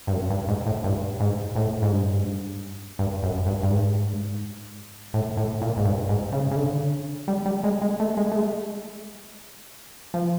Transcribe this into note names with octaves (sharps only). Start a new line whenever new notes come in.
G2
F#2
G2
G#2
A2
G2
G#2
A2
G#2
G2
G2
F#2
G2
G2
G#2
A2
A2
A#2
G#2
G2
G#2
C#3
C#3
D3
G3
G3
G#3
G#3
A3
G#3
A3
G#3
F3